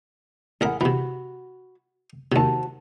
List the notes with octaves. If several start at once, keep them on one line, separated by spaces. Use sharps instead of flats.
A1 G#4 A#4 F#5 B5
C3 E3 F#4 B5
D#2 C3 F#4 C5 A5